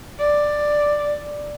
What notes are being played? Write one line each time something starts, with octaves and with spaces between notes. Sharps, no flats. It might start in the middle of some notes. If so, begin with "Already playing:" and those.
D5